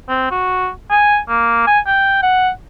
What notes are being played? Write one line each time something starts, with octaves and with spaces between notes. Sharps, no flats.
C4
F#4
G#5
A#3
G#5
G5
F#5